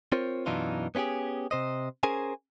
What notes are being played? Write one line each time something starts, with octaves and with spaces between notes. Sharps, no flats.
C4 F4 A#4 C5 C#5
F#2 B2 E3 D4 D#4 F4
B3 C#4 F4 G4 G#4
C3 C5 D#5
C#4 G#4 A#4 C5 G#5